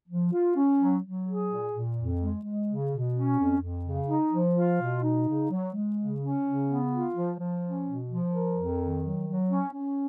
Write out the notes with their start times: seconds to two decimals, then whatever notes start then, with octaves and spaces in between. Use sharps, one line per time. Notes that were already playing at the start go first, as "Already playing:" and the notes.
0.08 F3
0.32 F4
0.55 C#4
0.79 F#3
1.03 F#3
1.26 G#4
1.49 A#2
1.72 A#2
1.96 F2
2.21 G#3
2.44 G#3
2.67 C#3
2.91 B2
3.14 C#4
3.37 F2
3.61 F2
3.84 C#3
4.08 D#4
4.31 F3
4.55 F4
4.80 B2
5.03 D#4
5.27 C#3
5.50 F#3
5.73 G#3
5.97 C#3
6.20 C#4
6.43 C#3
6.67 B3
6.91 F4
7.15 F3
7.38 F3
7.62 C#4
7.85 B2
8.09 F3
8.31 A#4
8.56 F2
8.79 D#3
9.02 F#3
9.26 F#3
9.49 C#4
9.73 C#4